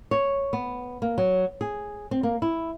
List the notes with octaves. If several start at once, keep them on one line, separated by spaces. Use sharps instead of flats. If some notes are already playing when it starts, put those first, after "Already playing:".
C#5
B3
A#3
F#3
G#4
C4
A#3
E4